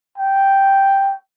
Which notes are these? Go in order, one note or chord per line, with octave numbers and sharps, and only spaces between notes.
G5